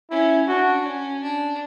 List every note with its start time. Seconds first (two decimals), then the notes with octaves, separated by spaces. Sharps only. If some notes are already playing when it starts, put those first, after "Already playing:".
0.10 C#4 E4
0.47 D4 F#4
0.85 C#4
1.23 D4